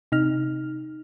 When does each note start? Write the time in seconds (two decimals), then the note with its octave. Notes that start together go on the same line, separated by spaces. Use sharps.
0.12 C3 D#4 F6